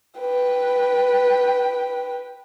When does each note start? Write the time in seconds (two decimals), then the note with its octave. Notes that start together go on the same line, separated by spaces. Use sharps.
0.19 B4 G5